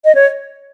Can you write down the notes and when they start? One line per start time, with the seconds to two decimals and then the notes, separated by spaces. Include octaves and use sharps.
0.05 D#5
0.15 C#5